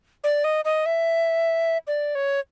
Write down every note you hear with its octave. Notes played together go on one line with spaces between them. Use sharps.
D5
D#5
D#5
E5
D5
C#5